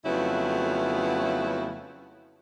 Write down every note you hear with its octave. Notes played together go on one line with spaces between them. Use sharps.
F2 C#3 F#3 A3 B3 E4